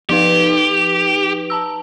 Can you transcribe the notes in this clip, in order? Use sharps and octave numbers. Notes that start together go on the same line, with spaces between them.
F3 D#4 G4 B4
A5 A#5 E6